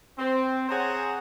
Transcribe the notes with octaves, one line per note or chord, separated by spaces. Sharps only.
C4
G#4 C5 C#5 F#5 G#5 A#5